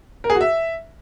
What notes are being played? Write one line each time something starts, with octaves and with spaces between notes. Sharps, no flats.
A#4
G#4
F#4
E5